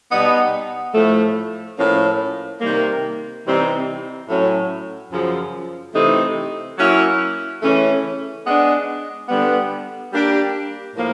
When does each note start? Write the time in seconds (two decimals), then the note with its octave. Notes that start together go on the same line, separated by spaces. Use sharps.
0.11 B2 G3 B3 D#4
0.94 A2 F3 A3
1.77 A2 F3 A#3 C#4
2.61 C3 D#3 G3 A#3
3.45 C3 E3 G3 C4 D#4
4.28 A2 F#3 A3 C#4
5.11 F#2 C#3 F3
5.94 C3 E3 A3 C4 D#4
6.78 F#3 A#3 C#4 E4
7.62 C#3 E3 A3 C#4
8.45 G#3 B3 D4
9.29 D3 G3 B3
10.12 G3 A#3 D4 G4
10.95 A2 F3 A#3